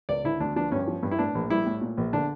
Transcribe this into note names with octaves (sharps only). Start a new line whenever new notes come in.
C#2 D5
D3 E4
D2 D4
F3 D4
G2 C#4
F3
G2
E4
A2 D4
A#1
G3 E4
A2
A#2
A#1
D3 D4